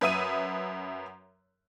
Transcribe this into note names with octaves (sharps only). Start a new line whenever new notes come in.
F#2 B4 E5 D#6 D#7